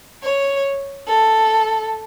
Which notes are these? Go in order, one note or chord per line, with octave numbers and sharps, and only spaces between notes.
C#5
A4